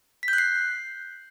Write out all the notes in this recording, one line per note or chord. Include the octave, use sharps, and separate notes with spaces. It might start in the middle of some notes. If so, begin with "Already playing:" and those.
B6
G6
F#6
C7